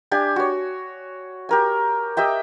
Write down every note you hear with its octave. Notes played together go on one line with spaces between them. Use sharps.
D4 G4 G#5
F#4 C#5
G4 A#4 G#5
G4 D#5 E5 G5